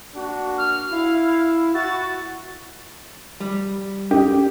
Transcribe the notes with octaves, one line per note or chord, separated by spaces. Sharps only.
A#3 D4 F#4
F6
E4 F5
F#4 A6
G3
C#4 G4 A4